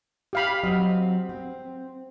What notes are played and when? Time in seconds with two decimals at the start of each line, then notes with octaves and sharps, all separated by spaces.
0.33 G4 F5 B5
0.63 F#3 C4 D#5
1.29 C4